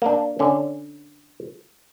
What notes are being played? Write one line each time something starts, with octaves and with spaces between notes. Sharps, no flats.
A#3 D4
D3 C#4